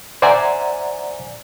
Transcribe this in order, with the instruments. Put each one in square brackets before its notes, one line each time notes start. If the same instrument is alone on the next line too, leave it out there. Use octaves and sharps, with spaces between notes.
[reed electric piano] C5 D5 E5 F#5 G#5 A#5